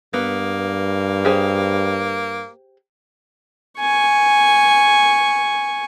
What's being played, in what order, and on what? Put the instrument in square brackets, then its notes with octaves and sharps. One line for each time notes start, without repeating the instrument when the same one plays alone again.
[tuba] G2 [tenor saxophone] A#3 [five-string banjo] B3
[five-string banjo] G4 G#4 C5
[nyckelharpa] G#5 C#6